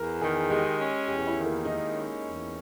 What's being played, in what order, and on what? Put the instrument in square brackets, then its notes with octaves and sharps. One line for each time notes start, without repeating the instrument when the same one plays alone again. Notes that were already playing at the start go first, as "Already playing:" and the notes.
Already playing: [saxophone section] E2 [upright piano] A#4
[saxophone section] D#3 [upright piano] G#4
[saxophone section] G#3 [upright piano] G4
[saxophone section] C#4
[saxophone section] E2 [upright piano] G4
[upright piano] G4
E4
[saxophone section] D#3
[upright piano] A#3
[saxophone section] G#3 [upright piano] D#4
[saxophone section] C#4
E2